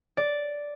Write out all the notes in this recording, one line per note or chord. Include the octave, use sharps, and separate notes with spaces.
D5